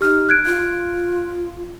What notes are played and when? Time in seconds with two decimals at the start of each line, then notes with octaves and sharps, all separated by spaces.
0.01 D#4 G4 F6
0.29 F#6 G#6 D7
0.46 F4